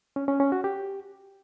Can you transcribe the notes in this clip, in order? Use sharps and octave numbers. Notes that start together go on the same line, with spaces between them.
C#4
C#4
C#4
F#4
G4